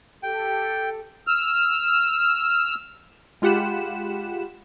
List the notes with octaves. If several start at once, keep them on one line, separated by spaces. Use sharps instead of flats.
G4 A4 G5
E6 F6
G#3 F4 G4 F#5 B5 E7